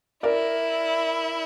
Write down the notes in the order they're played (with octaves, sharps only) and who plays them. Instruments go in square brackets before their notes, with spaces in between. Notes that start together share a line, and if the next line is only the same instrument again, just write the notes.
[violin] E4 [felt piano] A#4 D5